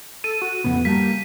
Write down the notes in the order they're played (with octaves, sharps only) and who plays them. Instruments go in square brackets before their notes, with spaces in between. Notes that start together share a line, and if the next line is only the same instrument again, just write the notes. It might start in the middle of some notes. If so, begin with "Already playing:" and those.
[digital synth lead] A4 [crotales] D#7
[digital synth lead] F#4
[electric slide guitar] F2 A2 C#3 [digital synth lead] B3
[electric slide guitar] G3 G4 A5 [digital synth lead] A#3 [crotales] B6